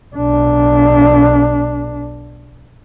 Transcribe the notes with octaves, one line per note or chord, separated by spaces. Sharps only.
B1 D4